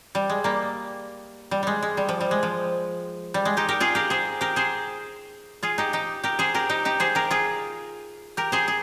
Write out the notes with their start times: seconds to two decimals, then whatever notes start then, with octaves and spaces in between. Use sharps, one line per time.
0.15 G3
0.30 G#3
0.44 G3 A#3
1.51 G3
1.63 G3 G#3
1.82 G#3
1.97 G3
2.09 F3
2.21 G3
2.31 G#3
2.43 F3
3.34 G3
3.45 G#3
3.57 D#4 G4
3.68 G4 A#4
3.80 F4 G#4
3.95 G4 A#4
4.10 G#4 C5
4.41 G4 A#4
4.56 G#4 C5
5.63 F4 G#4
5.78 D#4 G4
5.93 D#4 G4
6.24 G4 A#4
6.39 G#4 C5
6.54 G4 A#4
6.69 D#4 G4
6.85 D#4 G4
7.00 G#4 C5
7.15 G4 A#4
7.30 F4 G#4
8.37 G4 A#4
8.52 G#4 C5
8.68 G#4